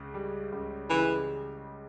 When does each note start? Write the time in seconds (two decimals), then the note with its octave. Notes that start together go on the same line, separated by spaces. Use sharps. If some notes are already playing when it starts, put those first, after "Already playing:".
Already playing: C#2 C#3
0.14 G3
0.52 C#2
0.90 C#3 E3